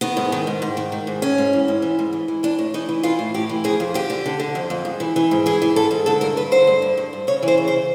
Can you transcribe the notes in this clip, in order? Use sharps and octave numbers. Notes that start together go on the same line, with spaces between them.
D#3 B3
G#2
D#3
G#2
G#2
D#3
D#3
G#2
G#2 C#4
G#2
E3
G#2
E3
G#2
E3
E3
E3 D4
A2
E3 D#4
E3
E3 F4
A2
A2 G4
E3
F2 G#4
F2
D3 G4
D3
D3
D3
F2
F2
G#2
E3
E3
G#2
E3 G#4
E3
G#2 A4
G#2
D3 A4
G2 A#4
G2 B4
D3 C5
G2
D3
G2
G2
C#3 C#5
E3
C5
C#3
C5